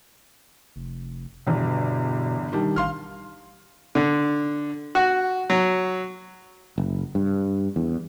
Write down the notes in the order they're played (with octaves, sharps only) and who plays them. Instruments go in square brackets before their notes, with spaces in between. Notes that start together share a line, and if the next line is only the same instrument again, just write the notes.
[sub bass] F1
[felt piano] G1 E2 [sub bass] B2
[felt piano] D#3 G3 D4
[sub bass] A1 [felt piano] F5 C6 F6
[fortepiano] D3
F#4
F#3
[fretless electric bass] F#1
G2
E2